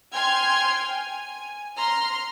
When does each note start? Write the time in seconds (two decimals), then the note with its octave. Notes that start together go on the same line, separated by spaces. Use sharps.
0.13 G5 G#5 C6 F6 G#6
0.91 G#5
1.77 A#5 C6 F6